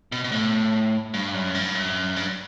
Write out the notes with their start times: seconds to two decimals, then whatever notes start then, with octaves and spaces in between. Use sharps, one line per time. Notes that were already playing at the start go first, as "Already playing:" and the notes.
0.12 B2
0.24 B2
0.32 A2
1.14 G2
1.34 F#2
1.55 G2
1.75 F#2
2.16 G2